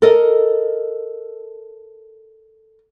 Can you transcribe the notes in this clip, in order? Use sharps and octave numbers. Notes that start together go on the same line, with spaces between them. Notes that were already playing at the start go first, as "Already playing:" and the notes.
A4 A#4 D#5